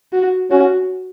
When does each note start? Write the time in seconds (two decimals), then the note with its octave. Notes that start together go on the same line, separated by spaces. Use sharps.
0.13 F#4
0.50 C#4 F#4